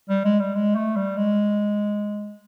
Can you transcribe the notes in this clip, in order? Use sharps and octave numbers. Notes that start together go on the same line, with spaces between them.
G3
G#3
G3
G#3
A3
G3
G#3